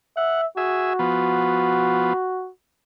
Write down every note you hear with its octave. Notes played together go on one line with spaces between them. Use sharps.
E5 F#5
F#4 G#4 E5
F3 B3